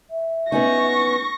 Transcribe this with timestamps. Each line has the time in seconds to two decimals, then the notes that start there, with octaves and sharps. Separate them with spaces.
0.10 E5
0.52 B3 C#4 D#4 C#6 A#6